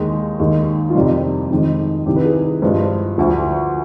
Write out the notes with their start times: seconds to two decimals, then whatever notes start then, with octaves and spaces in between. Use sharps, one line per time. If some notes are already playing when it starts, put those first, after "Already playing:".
Already playing: D#2 D#3 G#3 D#4
0.39 D#2 D#3 G#3
0.90 F4
0.95 F2 C3 G3 D#4
1.50 F2 D#3 G#3
2.06 C2 C3 D#3 G4
2.16 B4
2.25 G#4
2.62 G2 F3 G#3 C5
3.17 D2 D3 F3